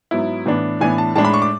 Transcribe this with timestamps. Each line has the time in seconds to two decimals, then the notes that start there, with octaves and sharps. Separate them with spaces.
0.11 G#2 F#3 B3 E4
0.46 A2 E3 B3 D4
0.81 A2 E3 B3 D4 G#5
0.98 A5
1.16 A2 G#3 D4 A5
1.25 B5
1.34 C#6
1.42 D6